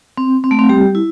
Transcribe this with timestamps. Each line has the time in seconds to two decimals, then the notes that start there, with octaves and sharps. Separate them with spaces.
0.18 C4
0.44 C4
0.51 A3
0.59 C4
0.69 G3 G4
0.95 E4